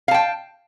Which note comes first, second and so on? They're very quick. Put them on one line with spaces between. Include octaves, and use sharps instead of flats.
F5 A5 G5